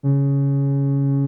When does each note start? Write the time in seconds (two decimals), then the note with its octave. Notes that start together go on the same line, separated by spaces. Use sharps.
0.03 C#3